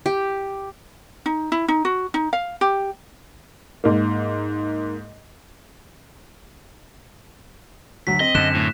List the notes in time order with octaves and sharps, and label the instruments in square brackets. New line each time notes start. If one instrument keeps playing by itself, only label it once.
[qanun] G4
[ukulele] D#4
E4
D#4
F#4
D#4
F5
G4
[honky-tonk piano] G#2 A#3
[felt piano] D2 F#3 [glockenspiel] B6
[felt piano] C4 [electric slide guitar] D#5
[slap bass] F#2 D3 [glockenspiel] F#6 E7
[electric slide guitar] A2